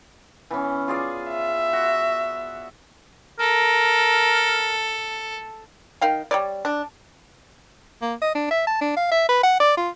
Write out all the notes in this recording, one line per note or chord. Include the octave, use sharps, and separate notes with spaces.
E3 B3 C#4
F4 G#4 D5
E5
F#4
A4 A#4
D#3 F5 G5
G3 C#5 D5
D4
A#3
D#5
D4
E5
A5
D4
F5
E5
B4
F#5
D5
F4